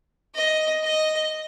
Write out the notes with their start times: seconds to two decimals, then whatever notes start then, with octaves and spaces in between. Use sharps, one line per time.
0.35 D#5
0.83 D#5